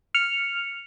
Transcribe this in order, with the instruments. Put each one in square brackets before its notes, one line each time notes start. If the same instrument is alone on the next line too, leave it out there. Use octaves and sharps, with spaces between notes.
[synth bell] F6 C#7 F7